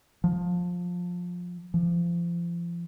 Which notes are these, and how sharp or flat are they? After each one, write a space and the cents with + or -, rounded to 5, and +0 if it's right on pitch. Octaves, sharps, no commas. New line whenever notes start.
F3 +20
F3 -30